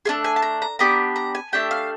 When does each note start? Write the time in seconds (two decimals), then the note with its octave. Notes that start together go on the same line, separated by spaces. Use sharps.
0.05 A3 D4 F4 G#4
0.24 G#5
0.36 A5
0.42 A#5
0.62 A#5
0.79 B3 D4 G4 A#5
1.16 A#5
1.35 G#5
1.53 A3 D4 G4 G5
1.71 F5